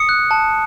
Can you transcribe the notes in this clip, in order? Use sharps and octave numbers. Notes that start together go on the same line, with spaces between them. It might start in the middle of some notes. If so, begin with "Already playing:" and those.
Already playing: D#6 C#7
F#6
A5